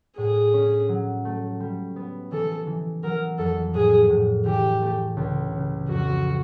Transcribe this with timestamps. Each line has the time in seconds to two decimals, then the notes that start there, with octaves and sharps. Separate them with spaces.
0.17 A2 G#4
0.54 C#4
0.89 F#3
1.25 A3
1.60 G3
1.96 B3
2.32 E3 A4
2.67 E3
3.03 F#3 A#4
3.38 F2 A4
3.74 A2 G#4
4.10 A2
4.46 E3 G4
4.82 A3
5.17 C#2
5.52 C#3
5.88 F2 F#4